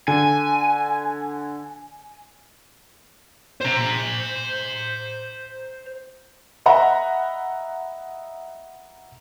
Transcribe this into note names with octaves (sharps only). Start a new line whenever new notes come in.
D3 G#5
C5 A#5
D#5 E5 F#5 A#5 B5